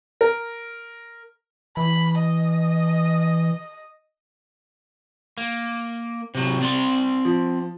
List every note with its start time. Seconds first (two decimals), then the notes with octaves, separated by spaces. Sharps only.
0.21 A#4
1.77 E3 B5
2.19 D#5
5.38 A#3
6.35 C3 F#3
6.61 C4 D5 C6
7.25 F3